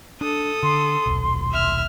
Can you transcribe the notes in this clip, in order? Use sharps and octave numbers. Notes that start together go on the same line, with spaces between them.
D4 A4 D#6
D3 C6
D#1 B1
E5 F6